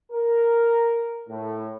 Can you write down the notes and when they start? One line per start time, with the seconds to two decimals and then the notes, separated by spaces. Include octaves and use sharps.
0.12 A#4
1.28 A2